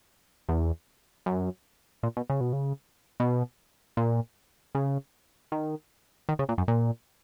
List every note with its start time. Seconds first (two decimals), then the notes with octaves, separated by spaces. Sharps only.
0.49 E2
1.26 F#2
2.03 A#2
2.17 B2
2.30 C#3
2.41 B2
2.53 C#3
3.20 B2
3.97 A#2
4.75 C#3
5.52 D#3
6.29 D#3
6.39 C#3
6.49 A#2
6.58 F#2
6.68 A#2